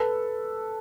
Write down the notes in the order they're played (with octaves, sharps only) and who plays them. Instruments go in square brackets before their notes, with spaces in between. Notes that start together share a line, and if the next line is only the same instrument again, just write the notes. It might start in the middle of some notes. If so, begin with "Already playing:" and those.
Already playing: [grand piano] A4 B4